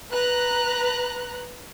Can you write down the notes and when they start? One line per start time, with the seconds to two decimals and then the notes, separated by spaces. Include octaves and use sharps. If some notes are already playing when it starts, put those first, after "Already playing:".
0.10 B4 A#5 F#6